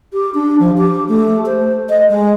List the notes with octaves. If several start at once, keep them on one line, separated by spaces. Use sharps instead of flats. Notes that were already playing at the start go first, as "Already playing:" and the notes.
G4
D4
F3
G4
A3
C5
D#5
G#3